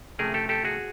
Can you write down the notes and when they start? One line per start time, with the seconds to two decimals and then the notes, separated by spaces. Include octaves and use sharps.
0.19 C3 F3 A3 C#4 G#4 A#4
0.34 G4 A4
0.49 G4 A4
0.65 F#4 G#4